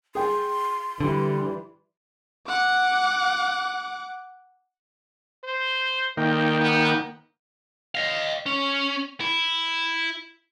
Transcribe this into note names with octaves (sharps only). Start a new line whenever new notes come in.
G#4 G5 C6
D3 E3 G3
F#5 D6
C5
D2 D#3 A#3 G5
B3
D#5 F5
C#4
E4